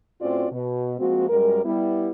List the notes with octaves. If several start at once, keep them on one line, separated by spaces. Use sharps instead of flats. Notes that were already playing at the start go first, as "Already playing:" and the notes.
A2 C4 C#4 F4 F#4 D5
B2
F3 G#3 A#3 C4 F#4
F#2 G3 G#3 A#4
G3 B3 E4